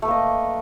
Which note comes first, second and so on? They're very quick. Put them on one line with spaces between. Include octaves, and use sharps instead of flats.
A3 B4 A#3 D#5